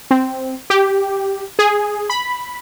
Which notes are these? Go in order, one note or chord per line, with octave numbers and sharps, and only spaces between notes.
C4
G4
G#4
B5